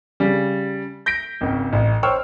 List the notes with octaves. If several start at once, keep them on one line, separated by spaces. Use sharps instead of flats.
C#3 G3
G6 A#6 B6 D7
G#1 C#2
A1
C5 C#5 G5 C#6 E6 F6